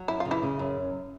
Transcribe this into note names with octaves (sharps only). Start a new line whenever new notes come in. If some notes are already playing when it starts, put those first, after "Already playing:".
Already playing: F#3
F#2 E4
C#3 F4
E3 E4
C#3
F#2